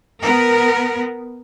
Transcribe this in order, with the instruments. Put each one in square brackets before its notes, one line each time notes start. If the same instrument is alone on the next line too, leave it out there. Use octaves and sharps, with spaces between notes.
[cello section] B3 A#4